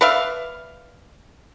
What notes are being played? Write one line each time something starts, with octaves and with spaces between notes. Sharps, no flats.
B4 D5 E5 F5